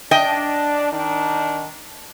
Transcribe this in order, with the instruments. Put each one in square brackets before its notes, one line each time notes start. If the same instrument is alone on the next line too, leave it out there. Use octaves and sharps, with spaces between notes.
[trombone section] D4 [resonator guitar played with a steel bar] D#5 G5
[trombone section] D#3 D4 D#4